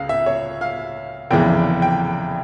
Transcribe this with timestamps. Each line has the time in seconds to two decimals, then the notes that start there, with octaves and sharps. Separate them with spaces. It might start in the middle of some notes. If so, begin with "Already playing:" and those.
Already playing: C#2 C#3 F5
0.09 E5
0.26 C#5
0.61 F5
1.31 F1 E2 C#3 E3 G5
1.82 G5